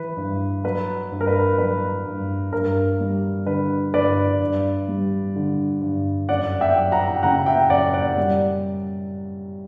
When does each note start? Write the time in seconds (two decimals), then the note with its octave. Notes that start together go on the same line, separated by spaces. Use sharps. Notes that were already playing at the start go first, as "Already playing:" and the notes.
Already playing: E3 B4
0.17 G2
0.64 F#3 B4
1.12 G2
1.21 A#4
1.27 B4
1.58 F#3 B4
2.06 G2
2.52 G2 A#4
3.00 G3
3.46 D3 B4
3.94 G2 B4 D5
4.41 G2
4.88 G3
5.36 D3
5.82 G2
6.29 F#2 D5 F#5
6.61 E5 G5
6.76 F#3
6.92 F#5 A#5
7.16 G5
7.23 C#3 F#5 A#5
7.46 E5 G5
7.70 F#2 D5 F#5
7.94 D5 F#5
8.17 G3